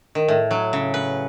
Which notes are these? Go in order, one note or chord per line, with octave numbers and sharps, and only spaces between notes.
D#3
A2
F#3
C#3
B4